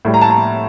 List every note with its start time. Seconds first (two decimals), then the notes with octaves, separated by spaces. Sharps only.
0.05 A2 G3
0.14 A#5
0.21 A5
0.30 A#5